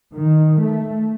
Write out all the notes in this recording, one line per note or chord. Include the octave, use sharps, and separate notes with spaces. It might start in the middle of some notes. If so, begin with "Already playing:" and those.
D#3
A3